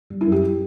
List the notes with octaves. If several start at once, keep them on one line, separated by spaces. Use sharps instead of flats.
G3
E4
F#2
G4